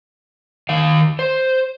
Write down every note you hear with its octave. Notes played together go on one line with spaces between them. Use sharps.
D#3 F5
C5